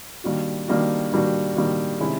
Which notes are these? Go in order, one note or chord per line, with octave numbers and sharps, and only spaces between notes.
D#3 G3 A#3 D4 F#4
D#3 G3 A#3 D4 F#4
D#3 G3 A#3 D4 F#4
D#3 G3 A#3 D4 F#4
C3 D#3 G#3 C#4 E4